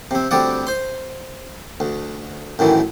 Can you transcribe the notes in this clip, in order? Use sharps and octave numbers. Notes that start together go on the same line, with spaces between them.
C3 C4
D2 G3 C4 D5 F#5
C5 C6
D2
F#2 A2 D#3 E3